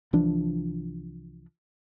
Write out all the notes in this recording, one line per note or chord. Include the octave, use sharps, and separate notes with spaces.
C2 E3 F3 D4